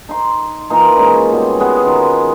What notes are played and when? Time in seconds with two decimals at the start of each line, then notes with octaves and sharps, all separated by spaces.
0.09 D#4 C6
0.70 E3 A#3 D#4 F4
0.97 G#3 C#4 D#4
1.32 B2 G3 G#3
1.60 G#3 B3
1.82 D#3 F4